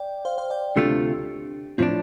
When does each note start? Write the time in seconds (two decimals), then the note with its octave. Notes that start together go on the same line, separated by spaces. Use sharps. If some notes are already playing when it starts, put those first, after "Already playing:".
Already playing: D5 G5
0.25 C5 F5
0.38 C5 F5
0.50 D5 G5
0.76 D2 C3 A3 D4 F4 G4
1.78 A2 F3 C4 D4 F4